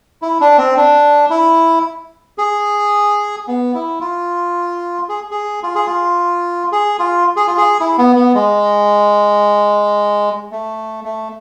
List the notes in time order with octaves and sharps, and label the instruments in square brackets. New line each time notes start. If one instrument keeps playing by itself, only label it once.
[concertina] E4
D4
C4
D4
E4
G#4
B3
E4
F4
G#4
G#4
F4
G#4
F4
G#4
F4
G#4
F4
G#4
E4
B3
B3
G#3
A3
A3